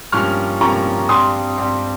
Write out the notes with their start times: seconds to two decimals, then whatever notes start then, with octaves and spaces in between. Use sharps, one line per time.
0.12 G2 F3 A#3 C#4 G4 C#6 F6
0.61 G2 F3 A#3 C#4 G4 A#5 C#6
1.09 G2 G3 C4 G4 C6 D#6
1.58 G2 G3 C4 G4